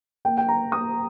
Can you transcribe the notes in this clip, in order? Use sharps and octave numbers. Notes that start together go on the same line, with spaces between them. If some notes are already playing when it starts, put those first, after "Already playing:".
A#3 G5
G5
A#5
A#3 D#6